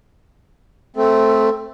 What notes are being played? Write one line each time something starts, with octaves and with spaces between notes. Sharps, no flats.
A3 C4 A4